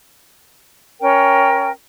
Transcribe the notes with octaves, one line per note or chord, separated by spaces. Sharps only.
C#4 A#4 G5